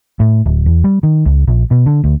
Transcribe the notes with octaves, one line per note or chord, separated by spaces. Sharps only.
A2
D1
E2
G3
D#3
C#2
A#1
B2
D3
D2